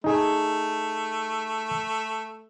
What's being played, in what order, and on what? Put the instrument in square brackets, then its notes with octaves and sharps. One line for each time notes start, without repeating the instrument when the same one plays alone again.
[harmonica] A3 [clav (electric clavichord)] D#4 G#4